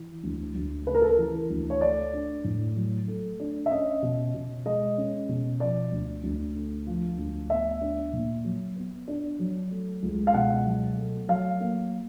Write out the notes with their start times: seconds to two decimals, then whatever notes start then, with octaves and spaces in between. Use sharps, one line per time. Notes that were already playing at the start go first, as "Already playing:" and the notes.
Already playing: E3
0.24 D2
0.55 D2
0.87 C#3 B4
0.95 A#4
1.02 A4
1.09 A#4
1.18 E3
1.50 D2
1.70 C#5
1.81 A3 D5
2.13 D4
2.44 A2
2.76 F#3
3.08 A3
3.40 D4
3.66 E5
3.71 C#4 D#5
4.02 B2
4.34 B2
4.65 G#3 D#5
4.97 C#4
5.29 B2
5.60 F3 D5
5.92 D2
6.24 D2
6.55 D3
6.87 F3
7.18 D2
7.50 B3 E5
7.81 D4
8.13 A#2
8.45 F#3
8.76 B3
9.08 D4
9.39 F#3
9.71 A3
10.03 C#2
10.27 F5
10.34 B2 F#5
10.65 F#3
10.97 A3
11.28 F#3 F5
11.60 A#3